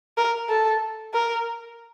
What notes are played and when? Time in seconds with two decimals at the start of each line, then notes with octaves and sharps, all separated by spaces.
0.17 A#4
0.49 A4
1.14 A#4